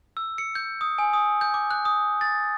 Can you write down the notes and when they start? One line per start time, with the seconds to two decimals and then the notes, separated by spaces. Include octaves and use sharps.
0.17 E6
0.38 C#7
0.55 G6
0.81 D#6
0.98 G#5
1.13 D#6
1.41 G6
1.54 D6
1.71 F#6
1.85 D#6
2.21 A6